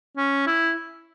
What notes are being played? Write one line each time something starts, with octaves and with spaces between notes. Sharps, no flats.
C#4
E4